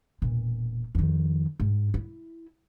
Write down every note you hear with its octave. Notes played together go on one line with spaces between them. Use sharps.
E1 A#2
F2 D#3
G#2
E4